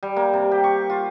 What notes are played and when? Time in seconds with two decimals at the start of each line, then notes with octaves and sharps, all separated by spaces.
0.03 G3
0.16 A#3
0.33 C3
0.52 G4
0.64 C#6
0.90 F4